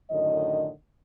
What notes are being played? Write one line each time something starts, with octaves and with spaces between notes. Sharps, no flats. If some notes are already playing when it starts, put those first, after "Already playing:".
F#2 A2 D3 D#3 D#5